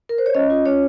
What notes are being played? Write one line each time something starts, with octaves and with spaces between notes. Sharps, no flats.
A#4
C5
C#5
C#4 D#5
F4
C#4 C#5